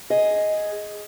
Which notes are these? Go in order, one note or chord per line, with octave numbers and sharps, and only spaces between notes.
G#4 D#5